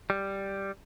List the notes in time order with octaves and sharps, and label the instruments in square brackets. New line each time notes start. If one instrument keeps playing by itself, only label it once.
[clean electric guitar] G3